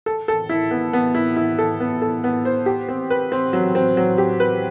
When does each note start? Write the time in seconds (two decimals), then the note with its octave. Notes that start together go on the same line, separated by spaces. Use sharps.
0.06 A4
0.28 A4
0.49 E4
0.71 B3
0.93 B3
1.15 E4
1.36 E4
1.59 A4
1.80 B3
2.02 A4
2.24 B3
2.45 C5
2.66 G4
2.89 C4
3.10 B4
3.32 C4
3.53 F#3
3.75 C4
3.97 F#3
4.18 G4
4.40 B4